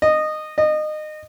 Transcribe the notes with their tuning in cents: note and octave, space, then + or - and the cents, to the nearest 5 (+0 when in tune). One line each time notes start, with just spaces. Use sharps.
D#5 -15
D#5 -25